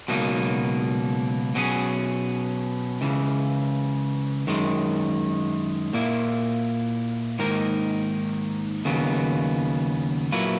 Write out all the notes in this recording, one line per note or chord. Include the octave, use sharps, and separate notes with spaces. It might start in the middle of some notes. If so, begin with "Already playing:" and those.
C#2 B2 F#3 A#3 D#4
B2 F#3 C#4 G#4
C#2 C#3 E3
F#2 D#3 G#3
A#2 A#3 E4
G#2 D#3 A#3 D#4 A#4
D#2 C#3 F#3 B3
A#2 F#3 A#3 E4 B4